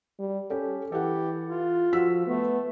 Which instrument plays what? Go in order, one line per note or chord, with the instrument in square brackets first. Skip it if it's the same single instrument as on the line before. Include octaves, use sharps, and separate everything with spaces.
[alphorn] G3
[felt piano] C#4 G4 [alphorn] A4
[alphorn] E3 [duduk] G4 [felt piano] A4 F#5
[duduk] F4
[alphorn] F3 [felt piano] F#4 E6 B6
[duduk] A3 [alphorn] B3